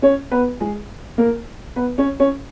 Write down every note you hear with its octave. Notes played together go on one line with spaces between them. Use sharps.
C#4 C#5
B3 B4
G#3 G#4
A#3 A#4
B3 B4
C#4 C#5
C#4 C#5